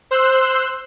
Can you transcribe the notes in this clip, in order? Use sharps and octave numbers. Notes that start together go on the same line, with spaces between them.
C5 C6 E6 F#6